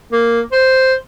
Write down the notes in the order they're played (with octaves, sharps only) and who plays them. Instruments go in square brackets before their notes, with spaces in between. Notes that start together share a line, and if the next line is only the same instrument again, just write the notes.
[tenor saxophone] A#3
C5